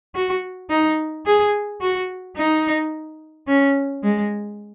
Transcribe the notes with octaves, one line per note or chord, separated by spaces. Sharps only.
F#4
D#4
G#4
F#4
D#4
C#4
G#3